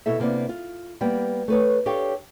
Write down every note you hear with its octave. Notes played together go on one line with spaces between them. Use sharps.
B2 E4 A4 E5
C3 A#3 B3 D4
F4
G3 A#3 B3 G5
A3 B4 C#5
D4 G4 A4 C#5 F5 G5